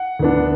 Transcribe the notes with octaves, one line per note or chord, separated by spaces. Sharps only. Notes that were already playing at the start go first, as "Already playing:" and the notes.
Already playing: F#5
D2 D3 B3 D4